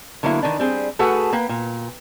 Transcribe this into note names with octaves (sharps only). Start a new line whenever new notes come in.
D3 F#3 A#3 B3 D#4 E4
D#3 E3 D4
G3 C4 G#4
A3 F#4 G#4 A4 B4 F#5
A#3 B4 G5
A#2